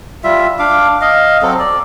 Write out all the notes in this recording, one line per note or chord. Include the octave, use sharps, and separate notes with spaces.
G3 F4 E5
D4 F5 D6
D#5 F5
F#3 C4 A4
D5